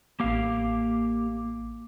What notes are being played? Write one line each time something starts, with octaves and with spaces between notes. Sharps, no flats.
A1 A#3 G4 F5 D6